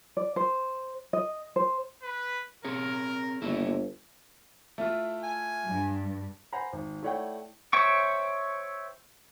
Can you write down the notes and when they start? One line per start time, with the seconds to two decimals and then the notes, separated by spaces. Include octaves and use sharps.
0.17 D5
0.36 C5
1.13 D#5
1.56 C5
2.03 B4
2.65 C4 G#4 A#4 C#5
3.42 G1 A#3 E4
4.78 A3 E4 F4
5.23 G#5
5.69 G2
6.52 C5 F#5 G#5 A#5 B5
6.73 G#1
7.03 A3 E4 C#5 D5 F#5 G5
7.73 C5 C#5 E5 G5 C#6